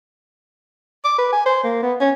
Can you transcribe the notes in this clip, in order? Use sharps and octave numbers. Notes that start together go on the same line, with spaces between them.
D6
B4
G#5
C5
A#3
B3
C#4